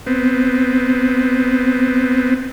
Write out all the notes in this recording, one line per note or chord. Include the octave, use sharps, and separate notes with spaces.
B3 C4